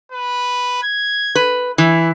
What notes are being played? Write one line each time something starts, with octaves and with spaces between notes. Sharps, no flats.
B4
G#6
B4
E3 E4